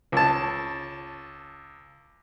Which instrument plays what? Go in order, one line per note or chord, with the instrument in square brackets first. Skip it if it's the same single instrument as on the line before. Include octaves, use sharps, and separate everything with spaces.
[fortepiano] C#2 A5